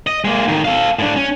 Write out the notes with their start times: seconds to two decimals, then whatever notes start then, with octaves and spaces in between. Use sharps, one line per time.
0.07 D#5
0.25 G#3 A#3
0.48 A2 D#3
0.65 A4 F5
0.99 A2 D4
1.16 C#4